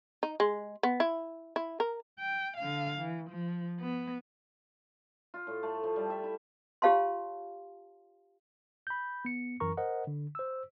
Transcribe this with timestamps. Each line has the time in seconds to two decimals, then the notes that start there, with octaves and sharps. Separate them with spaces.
0.23 D#4
0.40 G#3
0.83 B3
1.00 E4
1.56 E4
1.80 A#4
2.19 G5
2.57 D3 F5
2.98 E3
3.30 F3
3.80 B3
5.34 F4
5.47 A2
5.63 A3
5.83 F3
5.96 G3
6.10 E5
6.24 E4
6.82 F4 G4 C#5 F5 A5 C6
8.87 B5 G6
9.25 B3 C#7
9.60 F#2 E3 A#4 A#5 C#6
9.77 A#4 C5 D#5 F#5
10.07 D3
10.35 C5 E6